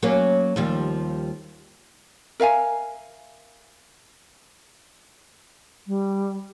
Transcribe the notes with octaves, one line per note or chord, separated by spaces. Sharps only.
F#3 A#3 C#4
D#2 F3 G3
A#4 E5 F5 G#5
G3